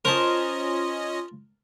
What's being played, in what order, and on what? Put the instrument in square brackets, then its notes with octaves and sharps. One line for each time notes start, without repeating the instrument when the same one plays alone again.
[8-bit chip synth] C#4 D#5 [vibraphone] F4 C6 [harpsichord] A#4 A5 [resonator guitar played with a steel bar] C5